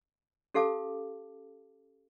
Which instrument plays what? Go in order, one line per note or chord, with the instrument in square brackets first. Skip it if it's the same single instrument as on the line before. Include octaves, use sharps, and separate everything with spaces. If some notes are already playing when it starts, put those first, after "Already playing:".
[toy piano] C#4 G4 A4 F5 A5 D6